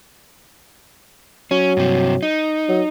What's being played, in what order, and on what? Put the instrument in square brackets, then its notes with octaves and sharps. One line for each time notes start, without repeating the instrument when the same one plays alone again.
[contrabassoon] F#3 [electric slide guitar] C#4
[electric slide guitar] G2 C3
D#4
[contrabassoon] F#3